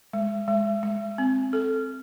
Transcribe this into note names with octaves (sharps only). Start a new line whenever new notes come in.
G#3
G#3
G#3
C4
A4